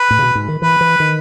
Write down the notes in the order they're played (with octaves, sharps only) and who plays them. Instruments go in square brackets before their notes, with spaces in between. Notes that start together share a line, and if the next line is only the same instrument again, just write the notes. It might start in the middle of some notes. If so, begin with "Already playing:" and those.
Already playing: [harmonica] B4
[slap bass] A2
C#3
B2
G#2
D#3
[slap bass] E3 [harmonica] B4
[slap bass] E3
D#3